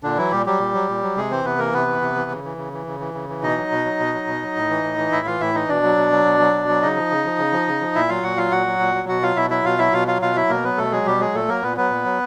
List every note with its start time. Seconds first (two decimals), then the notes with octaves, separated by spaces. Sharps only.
0.03 A#2 D3 D4
0.17 E3 F#3 E4
0.31 A#2 G3 G4
0.46 F#3 G3 G4
0.60 A#2
0.74 F#3
0.89 A#2
1.02 F#3
1.17 C3 G#3 G#4
1.31 E3 C4 C5
1.45 C3 B3 B4
1.58 E3 A#3 A#4
1.73 C3 B3 B4
1.87 E3
2.01 C3
2.16 E3
2.30 C#3
2.44 E3
2.57 C#3
2.73 E3
2.87 C#3
3.00 E3
3.14 C#3
3.29 E3
3.42 B2 D#4 D#5
3.58 F#3
3.72 B2
3.85 F#3
4.00 B2
4.14 F#3
4.27 B2
4.42 F#3
4.56 A2
4.70 E3
4.84 A2
4.98 E3
5.12 A2 E4 E5
5.27 E3 F4 F5
5.40 A2 E4 E5
5.54 E3 D#4 D#5
5.69 B2 D4 D5
5.84 F#3
5.97 B2
6.12 F#3
6.25 B2
6.40 F#3
6.54 B2
6.69 F#3
6.82 C#3 D#4 D#5
6.96 F3
7.11 C#3
7.25 F3
7.39 C#3
7.52 F3
7.68 C#3
7.81 F3
7.95 A#2 E4 E5
8.09 F#3 F4 F5
8.23 A#2 F#4 F#5
8.37 F#3 F4 F5
8.51 A#2 F#4 F#5
8.67 F#3
8.80 A#2
8.95 F#3
9.08 B2 F#4 F#5
9.22 F#3 F4 F5
9.36 B2 E4 E5
9.50 F#3 E4 E5
9.65 B2 F4 F5
9.78 F#3 E4 E5
9.93 B2 F4 F5
10.07 F#3 F4 F5
10.22 B2 F4 F5
10.36 F#3 E4 E5
10.49 B2 A#3 A#4
10.64 F#3 B3 B4
10.78 B2 A3 A4
10.92 F#3 G#3 G#4
11.06 B2 G3 G4
11.20 F#3 G#3 G#4
11.34 A#2 A3 A4
11.48 F#3 A#3 A#4
11.62 A#2 B3 B4
11.77 F#3 B3 B4
11.91 A#2
12.05 F#3